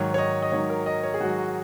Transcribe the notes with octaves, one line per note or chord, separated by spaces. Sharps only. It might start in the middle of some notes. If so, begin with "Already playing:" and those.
Already playing: G#2 D#3 F#3 C#5
C#5
D#5
D#5
G#2 D#3 F#3 C#5
A#4
D#5
C#5
G#4
G#2 D#3 F#3 F#4